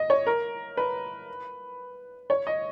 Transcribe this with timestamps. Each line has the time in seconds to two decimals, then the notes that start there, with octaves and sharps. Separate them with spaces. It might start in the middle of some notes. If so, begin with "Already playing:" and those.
Already playing: D#5
0.10 C#5
0.27 A#4
0.77 B4
2.30 C#5
2.47 D#5